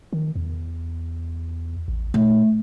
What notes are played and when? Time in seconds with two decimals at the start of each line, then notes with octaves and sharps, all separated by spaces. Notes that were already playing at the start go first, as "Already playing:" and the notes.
0.13 D#3
0.36 E2
1.88 A1
2.14 A#2 A3